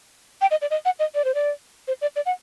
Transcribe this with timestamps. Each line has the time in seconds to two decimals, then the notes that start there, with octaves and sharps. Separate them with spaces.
0.41 G5
0.51 D#5
0.62 D5
0.70 D#5
0.85 F#5
0.99 D#5
1.15 D5
1.25 C5
1.35 D5
1.88 C5
2.02 D5
2.16 D5
2.26 F#5